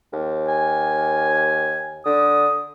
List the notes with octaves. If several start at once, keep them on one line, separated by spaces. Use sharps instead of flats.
D#2
G#5
D3 D#6